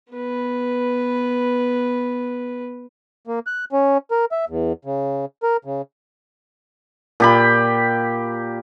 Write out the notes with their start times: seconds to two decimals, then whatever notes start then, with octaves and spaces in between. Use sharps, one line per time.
0.13 B3 B4
3.27 A#3
3.47 F#6
3.72 C#4
4.11 A#4
4.32 E5
4.49 E2
4.85 C#3
5.43 A#4
5.65 C#3
7.20 A#2 G4 B5